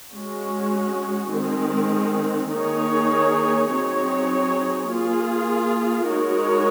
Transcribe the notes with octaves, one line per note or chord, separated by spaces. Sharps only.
G#3 C#4 F#4
D#3 G#3 C4
D#3 A#3 D#4 G#4 C#5
F#3 C4 D#4 G#4 C#5
A#3 F4 G#4
G#3 D#4 F#4 A#4 C#5